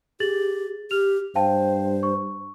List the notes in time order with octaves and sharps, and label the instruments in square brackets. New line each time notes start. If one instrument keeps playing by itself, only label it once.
[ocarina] G4 [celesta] G#4 A6 F#7
[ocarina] G4 [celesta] F6 F7
[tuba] G2 [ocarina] C5 [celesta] F5 G5 A5
[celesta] C#6